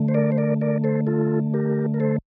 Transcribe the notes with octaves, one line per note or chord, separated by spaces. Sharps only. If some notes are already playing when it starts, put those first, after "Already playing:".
Already playing: D3 A3
C5
A#4 D5
C5
A#4 D5
A#4 D5
A4 C5
F4 A4
G4 A#4
A#4
A4 C5